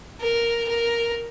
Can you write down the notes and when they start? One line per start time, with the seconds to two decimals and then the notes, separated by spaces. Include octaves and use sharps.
0.21 A#4
0.68 A#4